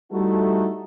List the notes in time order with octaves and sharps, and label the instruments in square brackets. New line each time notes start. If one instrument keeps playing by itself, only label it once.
[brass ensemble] G3 A3 D#4 E4 F#4 A4